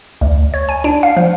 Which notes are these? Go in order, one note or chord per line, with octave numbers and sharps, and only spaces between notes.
D2
C#5
G#5
D4
F5
F3